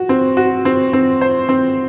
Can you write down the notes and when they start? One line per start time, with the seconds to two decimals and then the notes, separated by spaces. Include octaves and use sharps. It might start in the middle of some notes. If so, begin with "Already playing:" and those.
Already playing: F#4
0.09 C4
0.37 F#4
0.65 C4
0.93 C4
1.21 C5
1.49 C4